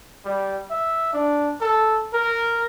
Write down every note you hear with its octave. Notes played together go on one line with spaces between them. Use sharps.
G3
E5
D4
A4
A#4